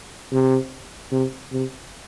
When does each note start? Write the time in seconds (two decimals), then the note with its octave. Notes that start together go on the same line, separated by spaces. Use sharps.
0.32 C3
1.12 C3
1.52 C3